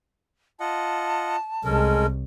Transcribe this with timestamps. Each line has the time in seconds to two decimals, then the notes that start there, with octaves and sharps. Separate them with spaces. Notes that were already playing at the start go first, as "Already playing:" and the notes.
0.60 F4 D#5 F#5 A5
1.64 C2 G#3 C#4 A4 A#4